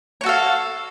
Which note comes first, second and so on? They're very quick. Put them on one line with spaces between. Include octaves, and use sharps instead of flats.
C#5 F#4 A4 F5